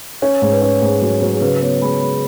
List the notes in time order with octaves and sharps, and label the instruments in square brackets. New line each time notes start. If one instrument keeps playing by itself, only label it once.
[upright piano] C#4 [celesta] C#5
[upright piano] G#2
[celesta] B4
[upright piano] C#4
[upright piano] G#2 [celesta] G#4
[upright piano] F#3
F#3
[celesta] G#4
[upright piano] C#3 [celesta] B4
[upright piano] B3 [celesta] C#5
[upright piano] G#3 [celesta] B5
[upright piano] G#3 [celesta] B5